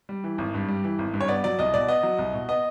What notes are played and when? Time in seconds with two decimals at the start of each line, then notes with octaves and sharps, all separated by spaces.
0.09 G3
0.24 E3
0.38 G#1
0.54 G2
0.68 G3
0.84 E3
0.99 G#1
1.14 G2
1.21 C#5
1.28 B3 D5
1.44 F#3 D5
1.59 C2 D#5
1.74 B2 D5
1.88 B3 D#5
2.03 F#3
2.18 C2
2.34 B2
2.49 B3 D#5